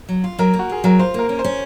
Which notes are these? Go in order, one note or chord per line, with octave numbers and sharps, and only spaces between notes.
F#3
F4
F#3 A#4
A#3
F#4
F4 G#4
F#3 A#4
F4 C5
A#3 A#4
C#4
C5
C#4